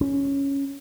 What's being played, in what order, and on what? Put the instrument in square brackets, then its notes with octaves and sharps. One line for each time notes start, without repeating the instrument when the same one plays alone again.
[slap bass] C#4